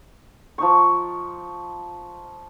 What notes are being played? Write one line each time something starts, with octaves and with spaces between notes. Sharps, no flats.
F3 D#4 C#6